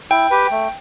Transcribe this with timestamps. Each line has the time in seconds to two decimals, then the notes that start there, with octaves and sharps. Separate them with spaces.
0.10 E4 G5
0.31 G4 B4
0.51 A3